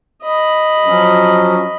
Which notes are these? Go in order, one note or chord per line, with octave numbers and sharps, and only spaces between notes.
D#5 B5
F3 F#3 C#4